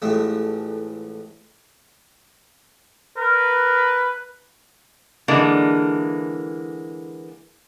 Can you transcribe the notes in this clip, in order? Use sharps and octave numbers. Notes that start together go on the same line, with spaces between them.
A1 F2 E3 G#3 A3
A#4 B4
D3 E3 G#3 A#3